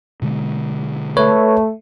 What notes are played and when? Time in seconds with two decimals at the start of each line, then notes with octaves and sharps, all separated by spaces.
0.22 B2 D3 G#3
1.17 A3 B4 C#5